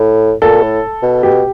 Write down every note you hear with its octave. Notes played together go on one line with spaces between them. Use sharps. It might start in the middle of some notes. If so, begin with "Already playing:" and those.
Already playing: A2
A#2 A4
A2
B2
B2 G4